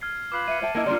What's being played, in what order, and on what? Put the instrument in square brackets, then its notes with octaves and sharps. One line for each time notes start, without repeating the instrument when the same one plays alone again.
[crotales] F6 G#6 C7
[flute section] F4 B4 [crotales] D6 C7 F#7
[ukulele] E5 [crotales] C#7 D#7
[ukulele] C5 E5 G5 [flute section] A5
[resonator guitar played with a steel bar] A#3 E4 [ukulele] D#5 F#5
[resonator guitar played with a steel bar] G3 A#3 D4 [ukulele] F4 D5 [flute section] A#4 C6